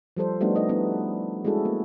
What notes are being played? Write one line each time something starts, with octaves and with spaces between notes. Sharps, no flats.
F3 G3 A4 C5
G3 A3 B3 D4 D#4 F#4
D#4 A4 B4 C5 D#5
B3 D4 E4
G#3 C#4 E4 F#4 G#4 A4
A#3